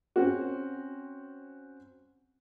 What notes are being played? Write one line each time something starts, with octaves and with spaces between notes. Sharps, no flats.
C4 C#4 F#4